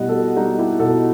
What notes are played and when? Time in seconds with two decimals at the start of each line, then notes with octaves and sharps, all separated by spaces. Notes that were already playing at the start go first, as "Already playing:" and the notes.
Already playing: B2 G3 E4 D#5 F#5
0.09 F#4 A4
0.37 G3 D#4 F#4
0.58 E4 G4
0.79 B2 F#4 A4